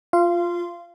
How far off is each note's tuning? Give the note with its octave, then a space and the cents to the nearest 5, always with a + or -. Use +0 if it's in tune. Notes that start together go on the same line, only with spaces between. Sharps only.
F4 +0 F5 -25 C6 -5